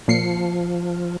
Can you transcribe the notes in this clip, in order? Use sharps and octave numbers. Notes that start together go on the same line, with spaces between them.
A#2 F3 C7 C#7